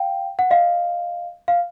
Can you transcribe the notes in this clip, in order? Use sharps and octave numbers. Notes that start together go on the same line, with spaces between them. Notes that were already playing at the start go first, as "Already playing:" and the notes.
Already playing: F5 G5
F#5
D#5 F5
F5